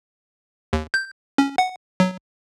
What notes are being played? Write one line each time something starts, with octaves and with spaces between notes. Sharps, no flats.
D#2
G6
C#4
F#5
F#3